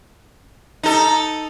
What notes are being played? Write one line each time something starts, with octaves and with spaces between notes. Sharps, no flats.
D#4 A4